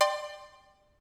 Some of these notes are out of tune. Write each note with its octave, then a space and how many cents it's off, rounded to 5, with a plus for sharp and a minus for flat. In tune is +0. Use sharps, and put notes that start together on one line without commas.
D5 +25 G5 +0 C6 +5